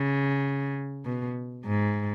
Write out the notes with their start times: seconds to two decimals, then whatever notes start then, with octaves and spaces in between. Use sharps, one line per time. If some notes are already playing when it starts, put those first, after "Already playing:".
Already playing: C#3
1.05 B2
1.66 G#2